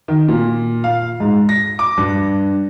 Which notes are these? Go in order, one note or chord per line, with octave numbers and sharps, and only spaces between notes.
D#3
A#2
F5
G#2
A#6
D6
G2